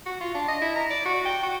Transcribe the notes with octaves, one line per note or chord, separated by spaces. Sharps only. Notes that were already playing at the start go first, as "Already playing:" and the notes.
F#4
F4
D4
D#5
E4
A#5
D5
F#4
G5
F#4